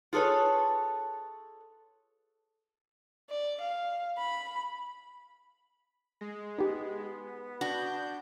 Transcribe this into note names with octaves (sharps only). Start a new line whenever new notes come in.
F4 G#4 A4 B4 C#5
D5
F5
B5
G#3 A#6 C7
B3 D#4 G4
D4 F#4 G6